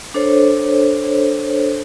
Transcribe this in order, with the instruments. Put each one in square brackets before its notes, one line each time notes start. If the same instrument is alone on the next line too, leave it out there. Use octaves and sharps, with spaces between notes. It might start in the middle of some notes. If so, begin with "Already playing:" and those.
[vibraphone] D4 A4 C5 C#5